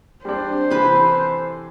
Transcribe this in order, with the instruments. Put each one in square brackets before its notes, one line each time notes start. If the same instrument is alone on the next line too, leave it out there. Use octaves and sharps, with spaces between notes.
[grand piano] G3 C4 D4 [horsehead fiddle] C5
[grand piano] C3 E3 [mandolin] A4 B4 B5